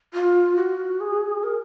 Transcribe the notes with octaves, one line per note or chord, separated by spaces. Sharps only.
F4
F#4
G#4
A#4